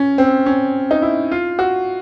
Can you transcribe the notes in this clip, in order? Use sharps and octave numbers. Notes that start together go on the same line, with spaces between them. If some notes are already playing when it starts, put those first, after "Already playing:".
Already playing: C#4
C4
C#4
D#4
E4
F4
F#4